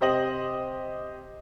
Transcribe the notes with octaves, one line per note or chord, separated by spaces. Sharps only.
C3 G4 C5 D#5 A#6 F#7